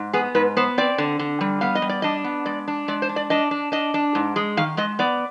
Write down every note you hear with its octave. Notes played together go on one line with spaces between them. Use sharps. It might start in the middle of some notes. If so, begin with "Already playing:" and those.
Already playing: G#2
B3 G#4
G#2 B4
B3 C5
C4 D5
D3
D3
G3
B3 F5
D#5
G3
D5
D4 D#5
B3
G#3 D5
D4
G#3 D5
C5
D4
D5
D4 D#5
D4
D4 D#5
D4
G#2
G#3
D#3 F5
G#3 D#5
B3 D5